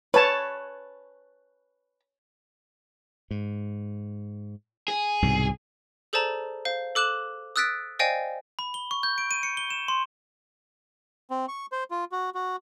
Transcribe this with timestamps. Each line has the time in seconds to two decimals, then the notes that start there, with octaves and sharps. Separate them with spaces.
0.14 B4 C#5 A5
3.31 G#2
4.88 G#4
5.22 C2 G#2 B2
6.13 G#4 A4 C5 D5 A5 A#5
6.65 C5 F5
6.95 A4 D6 F#6 E7 F#7
7.56 D#6 E6 F#6 A6 B6 D7
7.99 C5 D5 D#5 F5 G5 G#5
8.59 B5
8.74 G7
8.91 C#6
9.03 G6
9.18 D7
9.31 D#7
9.43 C#7
9.57 G7
9.70 E7
9.88 C6
11.31 C4
11.48 C#6
11.72 C5
11.91 F4
12.12 F#4
12.35 F#4